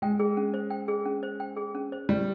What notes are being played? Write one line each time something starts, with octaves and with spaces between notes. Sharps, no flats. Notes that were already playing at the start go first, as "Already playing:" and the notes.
G#3 G5
G#4
C#4
C5
G5
G#4
C#4
C5
G5
G#4
C#4
C5
G3 G4